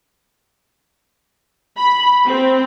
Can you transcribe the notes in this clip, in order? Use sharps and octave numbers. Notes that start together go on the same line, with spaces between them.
B5
C4